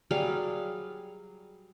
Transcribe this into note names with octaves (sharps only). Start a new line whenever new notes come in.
F#3 G3 G#4 F5